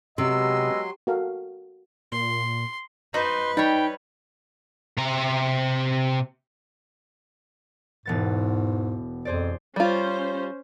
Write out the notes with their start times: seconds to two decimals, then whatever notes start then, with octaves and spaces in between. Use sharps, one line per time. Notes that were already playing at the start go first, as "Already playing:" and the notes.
0.18 C3 F#3 G#3 B3 D#5 C6 E6
1.07 F#4 A4 A#4 F5
2.12 A#2 C6
3.14 D#4 F#4 B4 C5 C6
3.57 G3 D#4 C#5 G5
4.97 C3 A#5
8.06 E1 G#2 B3 A6
9.25 F2 G#4 C5 D5
9.76 G3 C#4 F4 C5